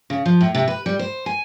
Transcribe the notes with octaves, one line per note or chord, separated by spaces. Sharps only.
C#3
F3
A2
C3
B4
G3
C5
G#5